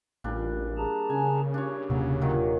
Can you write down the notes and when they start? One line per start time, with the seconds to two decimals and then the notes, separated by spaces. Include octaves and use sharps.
0.24 A1 A#2 G3 D4
0.77 G#4 A5 A#5
1.10 C#3 G#5
1.54 D4 G4 C#5
1.90 D#1 C3 F#3 A#3
2.22 A#2 D#3 F#3